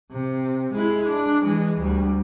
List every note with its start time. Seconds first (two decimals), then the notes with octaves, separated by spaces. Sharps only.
0.12 C3
0.73 G#3 E4
1.08 D4
1.41 E3 G#3
1.79 D2 G3